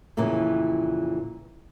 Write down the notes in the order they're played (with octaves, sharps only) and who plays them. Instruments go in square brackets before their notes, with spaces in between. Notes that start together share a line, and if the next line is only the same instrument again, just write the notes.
[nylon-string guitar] F2 A#2 C#3 E3